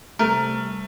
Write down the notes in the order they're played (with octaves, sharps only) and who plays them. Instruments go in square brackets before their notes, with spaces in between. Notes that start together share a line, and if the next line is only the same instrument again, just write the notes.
[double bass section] C3 G3 [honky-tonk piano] A3 [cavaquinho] A#4